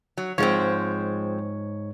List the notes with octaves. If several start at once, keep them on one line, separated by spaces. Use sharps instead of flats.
F#3
G#2 F3 G#3 C4 C#5